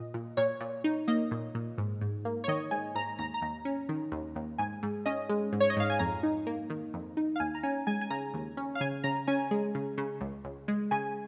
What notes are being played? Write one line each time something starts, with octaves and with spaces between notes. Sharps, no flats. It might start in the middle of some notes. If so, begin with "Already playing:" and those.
Already playing: A#2 D#5
A#2
A#2 C#5
A#2
D#4
A#3 D#5
A#2
A#2
G#2
G#2
A#3
C#5
D#3 D#5
G#2 G#5
G#2 A#5
D#2 A#5
A#5
D#2
C#4
D#3
D#2
D#2
G#2 G#5
G#2
C#4 D#5
G#3
G#2
C#5
D#5
G#2 F5
G#5
F2 A#5
D#4
A#3
D#3
F2
D#4
F5
D#2 G#5
A#5
C#4 G#5
G#3 G#5
G#5
C#3 A#5
D#2
C#4
F5
C#3 G#5
C#3 A#5
C#4 G#5
G#3
C#3
C#3
C#2
C#2
G#3
C#3 G#5